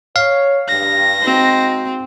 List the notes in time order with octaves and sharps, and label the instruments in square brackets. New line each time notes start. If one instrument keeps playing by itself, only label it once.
[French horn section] C#5 [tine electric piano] F5
[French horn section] G2 [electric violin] A#6
[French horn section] G#3 D#4 F#4 [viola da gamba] C4